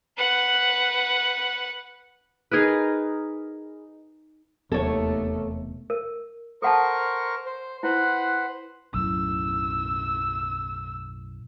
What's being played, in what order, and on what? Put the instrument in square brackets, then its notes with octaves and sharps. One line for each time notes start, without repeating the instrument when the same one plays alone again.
[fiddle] B4 F#5
[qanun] D#4 G#4 A#4 B4
[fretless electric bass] E1 C3 [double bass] D#2 A3 [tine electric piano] B3 [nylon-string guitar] A4 C#5
[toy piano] A#4
[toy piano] A4 F#5 A5 [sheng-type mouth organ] A#4 C5 C#6
[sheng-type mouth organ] C5
[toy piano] E4 [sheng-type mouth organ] B4 C5 F#5
[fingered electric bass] B1 F#2 A2 [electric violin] E6